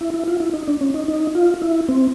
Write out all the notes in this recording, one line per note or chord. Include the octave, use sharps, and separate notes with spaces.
E4
E4
F4
E4
D#4
D4
C#4
D#4
D#4
F4
E4
C4